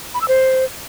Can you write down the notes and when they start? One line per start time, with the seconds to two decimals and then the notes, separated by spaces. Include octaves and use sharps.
0.14 B5
0.21 E6
0.28 C5